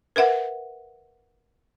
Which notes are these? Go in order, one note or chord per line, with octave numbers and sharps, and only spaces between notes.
A#4 B4 E5 F#5